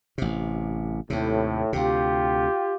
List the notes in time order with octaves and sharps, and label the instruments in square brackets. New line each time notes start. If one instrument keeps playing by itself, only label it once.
[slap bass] A1 C3
[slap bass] D#2 C3 [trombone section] A2
[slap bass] D2 C3 [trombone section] F4 G4